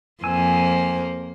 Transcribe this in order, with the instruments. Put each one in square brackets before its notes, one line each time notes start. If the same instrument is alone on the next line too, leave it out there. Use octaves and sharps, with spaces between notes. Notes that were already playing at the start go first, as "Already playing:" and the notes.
[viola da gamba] F2 A#3 C5 [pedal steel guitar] G#5 E6